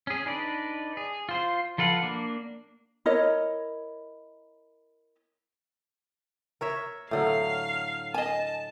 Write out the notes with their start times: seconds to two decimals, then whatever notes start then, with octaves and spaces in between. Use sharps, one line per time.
0.07 C#4 G#4
0.26 D4 D#4 B4 D5
0.97 G#4
1.29 F4 C5
1.78 F3 A4 B4 F5 F#5
2.02 A#3 D4
3.06 E4 A#4 C#5 D#5
6.61 A#4 C#5 E5
7.11 A2 D3 F#3 F5
8.14 D#5 G#5 A5